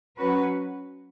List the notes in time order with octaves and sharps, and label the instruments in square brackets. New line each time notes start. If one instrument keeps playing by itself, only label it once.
[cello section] F#3 C#4 F#4 B4